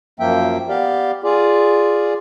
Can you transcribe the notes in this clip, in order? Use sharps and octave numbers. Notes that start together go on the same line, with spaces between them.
F#2 F3 A#3 E5 G5
B3 G4 D5 F5
F4 G#4 D5